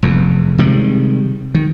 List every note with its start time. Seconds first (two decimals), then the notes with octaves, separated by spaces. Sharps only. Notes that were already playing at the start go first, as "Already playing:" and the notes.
0.03 F1 E2
0.58 C3 D#3 G3 G#3
1.55 D#3